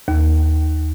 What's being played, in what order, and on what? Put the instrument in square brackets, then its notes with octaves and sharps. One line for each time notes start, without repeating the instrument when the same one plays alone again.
[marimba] D#2